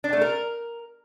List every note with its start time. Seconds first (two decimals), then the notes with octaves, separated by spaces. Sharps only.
0.04 D4
0.13 A3
0.21 A#4